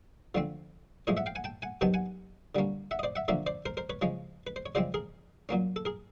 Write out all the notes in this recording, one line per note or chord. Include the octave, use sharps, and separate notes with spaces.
D3 F3 A3 C4
A2 F3 G#3 C#5 D#5
E5 F#5
F5 G5
F#5 G#5
G5 A5
F#5 G#5
C3 D#3 F#3 B3 G5 A5
F#5 G#5
D3 G3 A#3 C#4
E5 F#5
D#5
C5 D5
E5 F#5
D3 F3 A#3 C#4 D5 E5
C5 D5
A#4 C5
A#4 C5
B4 C#5
C#3 F3 G#3 C#4
B4
C5
C#5
C#3 F3 G#3 C4 C5 D5
G#4 A#4
A#2 F#3 A#3 C#4
A4
G#4 A#4